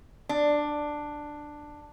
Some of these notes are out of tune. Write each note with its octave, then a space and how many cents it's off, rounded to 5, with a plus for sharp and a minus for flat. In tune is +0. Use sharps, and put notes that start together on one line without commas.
D4 +10